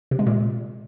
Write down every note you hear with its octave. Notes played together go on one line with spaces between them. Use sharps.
C3
G#3
A#2